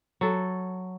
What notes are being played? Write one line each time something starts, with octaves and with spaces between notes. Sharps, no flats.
F#3 A4